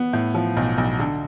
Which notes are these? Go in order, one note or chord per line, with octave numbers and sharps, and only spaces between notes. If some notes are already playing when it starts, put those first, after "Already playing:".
Already playing: B3
A2
F3
B1
B1
D3